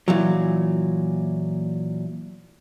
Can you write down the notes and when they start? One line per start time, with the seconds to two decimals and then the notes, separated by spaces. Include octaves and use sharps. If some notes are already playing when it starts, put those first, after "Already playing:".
0.08 A#2 E3 F#3